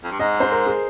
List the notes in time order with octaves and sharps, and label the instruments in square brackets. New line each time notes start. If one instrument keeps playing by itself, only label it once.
[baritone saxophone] F2
G2
[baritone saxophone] G#2 [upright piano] D#5
[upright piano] C5
A#4
G#4